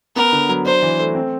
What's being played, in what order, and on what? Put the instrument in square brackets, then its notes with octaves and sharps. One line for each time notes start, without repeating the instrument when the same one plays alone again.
[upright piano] B3 [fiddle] A#4
[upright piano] D3
F#3
[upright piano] D4 [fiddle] C5
[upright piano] E3
A3
C4